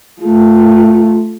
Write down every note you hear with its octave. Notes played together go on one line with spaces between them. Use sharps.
A3 F4